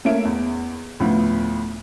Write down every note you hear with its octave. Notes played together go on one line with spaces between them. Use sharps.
A3 A#3 C#5 E5 D7
E2
D2 A2 F3 B3